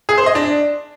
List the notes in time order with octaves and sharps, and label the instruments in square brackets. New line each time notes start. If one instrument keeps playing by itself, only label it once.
[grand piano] G#4
C5
D#5
D4